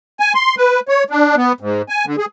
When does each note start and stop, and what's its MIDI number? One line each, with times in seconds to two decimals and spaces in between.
0.20 0.33 80
0.35 0.55 84
0.58 0.80 71
0.88 1.04 73
1.10 1.35 62
1.36 1.52 59
1.61 1.82 44
1.89 2.05 80
2.06 2.16 50
2.18 2.25 68